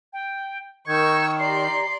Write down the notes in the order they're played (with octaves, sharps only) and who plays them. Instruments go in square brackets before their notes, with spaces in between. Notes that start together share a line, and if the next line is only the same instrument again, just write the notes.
[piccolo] G5
[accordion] D#3 [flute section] A#4 D#5 G6 [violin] C#6 E6 [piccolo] G#6
[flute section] G4 A#5 [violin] D5 C6 [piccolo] C7